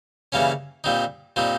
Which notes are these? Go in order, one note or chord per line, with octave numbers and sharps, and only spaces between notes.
C#3 E3 G3 A#3 C#4
A#2 G3 C4 D#4
A#2 G3 C4 D#4